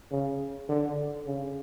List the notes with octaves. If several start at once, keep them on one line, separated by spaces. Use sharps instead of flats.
C#3
D3
C#3